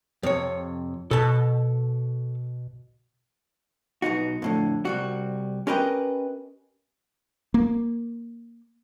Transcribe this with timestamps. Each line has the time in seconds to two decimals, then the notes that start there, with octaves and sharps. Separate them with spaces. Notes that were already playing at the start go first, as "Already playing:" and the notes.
0.23 F2 C3 C#5
1.11 B2 A4 A5
4.02 B1 B2 D#4 F#4
4.42 F2 A2 D3
4.85 C2 G3 F#4
5.67 C#4 G4 A#4 B4 D#5 G5
7.54 A#3